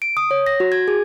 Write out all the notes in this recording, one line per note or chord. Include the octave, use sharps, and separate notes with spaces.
D7
D#6
C#5
A#6
F#4
G#6
G#4